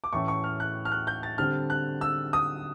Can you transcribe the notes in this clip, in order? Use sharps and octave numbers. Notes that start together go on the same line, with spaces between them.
D6
A2 E3 A3 C#4 C#6
C#6
F6
F#6
F6
F#6
G6
A6
D3 G3 C4 F6
F#6
E6
D#6